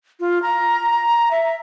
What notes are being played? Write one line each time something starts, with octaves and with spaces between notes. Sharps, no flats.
F4
A#5
E5